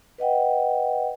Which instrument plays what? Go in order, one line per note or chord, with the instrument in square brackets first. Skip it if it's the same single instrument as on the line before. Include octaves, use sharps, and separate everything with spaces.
[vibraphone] B4 D#5 F#5 G5